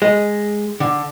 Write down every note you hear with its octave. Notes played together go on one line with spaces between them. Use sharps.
G#3
D3